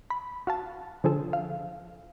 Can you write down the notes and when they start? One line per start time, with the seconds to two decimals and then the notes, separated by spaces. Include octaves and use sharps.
0.10 B5
0.47 F#4 F5 A5
1.04 D3 F3 G#4 A4
1.33 F5